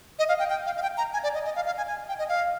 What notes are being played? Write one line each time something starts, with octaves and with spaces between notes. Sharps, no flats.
D#5
F5
G5
G5
F5
F5
G5
A#5
G#5
D5
D#5
D#5
F5
F5
G#5
G#5
G5
D#5
F5